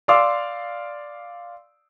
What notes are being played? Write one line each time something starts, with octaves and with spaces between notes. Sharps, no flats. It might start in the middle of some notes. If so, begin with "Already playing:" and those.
D5 F5 C6 D6 E6